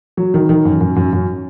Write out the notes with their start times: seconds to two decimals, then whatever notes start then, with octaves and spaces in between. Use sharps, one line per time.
0.17 F#3
0.34 D#3
0.49 D#3
0.65 F#2
0.81 F#2
0.96 F#2
1.13 F#2